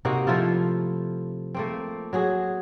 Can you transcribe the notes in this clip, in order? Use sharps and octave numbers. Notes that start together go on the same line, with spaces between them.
C3 A#3 D#4 F#4
F3 A3 E4 F4
A3 A#3 C4
F#3 F#4 G#4